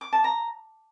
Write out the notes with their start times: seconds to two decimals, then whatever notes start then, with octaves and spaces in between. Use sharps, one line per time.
0.01 D6
0.13 A5
0.24 A#5